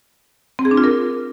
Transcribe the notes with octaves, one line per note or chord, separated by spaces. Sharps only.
C4
G#4
D4
F4
A#4